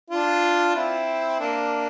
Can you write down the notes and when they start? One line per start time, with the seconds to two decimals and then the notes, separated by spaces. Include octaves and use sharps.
0.10 D4 F4
0.75 C4 E4
1.40 A#3 D4